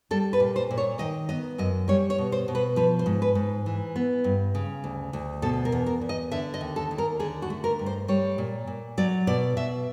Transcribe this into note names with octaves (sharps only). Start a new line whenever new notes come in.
G3 A4
B4
A#2
C5
A#2
C#5
D#3 D#5
B3 D#5
F#2 D#5
G3 C#5
C#5
B2
C5
B2
B4
F3 B4
C5
G#2
B4
G#2
E3
B3
G2
C#3
D2
D2
B2 A4
A#4
E2
A#4
E2
D#5
D3 E5
D#5
D#2
A4
D#2
A#4
D3 G#4
F#4
A3
A#4
G2
C5
G3 C#5
A#2
A#2
F#3 D5
B2 D5
B2 E5